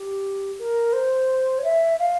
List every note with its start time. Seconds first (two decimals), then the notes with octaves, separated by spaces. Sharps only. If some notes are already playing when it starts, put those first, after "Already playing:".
Already playing: G4
0.59 A#4
0.93 C5
1.58 C#5
1.64 E5
1.99 F5